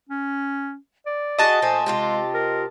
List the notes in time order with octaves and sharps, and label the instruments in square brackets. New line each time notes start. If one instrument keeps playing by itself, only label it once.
[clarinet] C#4
D5
[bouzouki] E4 F#4 G#4 [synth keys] D#5 A5
[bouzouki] A#2 A3 G#5 [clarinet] C5
[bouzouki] C3 F4 G4 [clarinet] G#3
[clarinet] A#4